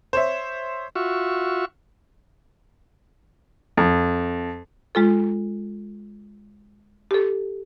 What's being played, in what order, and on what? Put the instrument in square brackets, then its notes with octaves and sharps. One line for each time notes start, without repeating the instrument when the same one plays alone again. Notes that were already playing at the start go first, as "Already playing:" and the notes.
[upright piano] C5 C#5 E5
[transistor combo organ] F4 F#4 E5 C#6
[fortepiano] F2
[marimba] G#3 F4 A4
G4 A4